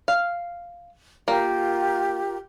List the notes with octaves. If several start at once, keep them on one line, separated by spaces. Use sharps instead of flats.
F5
A#3 F4 G4 A#4